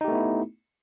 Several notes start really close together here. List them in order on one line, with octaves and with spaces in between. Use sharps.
D#4 G4 A3 B3 E4